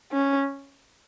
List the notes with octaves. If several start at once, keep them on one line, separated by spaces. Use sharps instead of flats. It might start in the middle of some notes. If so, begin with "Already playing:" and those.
C#4